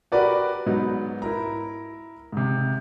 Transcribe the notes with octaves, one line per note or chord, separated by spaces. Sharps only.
F#4 G4 A#4 B4 D5 F#5
G#2 F#3 B3 D#4
E4 A#4 A#5
G#2 C3